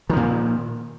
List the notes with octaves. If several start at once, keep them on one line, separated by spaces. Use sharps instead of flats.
A#2 D#3 F3